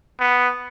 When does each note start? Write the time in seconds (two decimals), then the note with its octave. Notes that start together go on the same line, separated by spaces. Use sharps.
0.20 B3